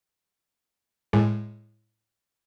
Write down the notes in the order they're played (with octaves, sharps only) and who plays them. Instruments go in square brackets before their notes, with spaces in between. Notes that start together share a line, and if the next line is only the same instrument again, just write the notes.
[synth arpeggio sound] A2 G#3